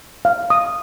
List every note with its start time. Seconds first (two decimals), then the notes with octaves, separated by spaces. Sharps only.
0.25 F5
0.50 D#6